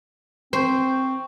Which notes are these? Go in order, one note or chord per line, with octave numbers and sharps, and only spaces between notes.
C4 C5 C#6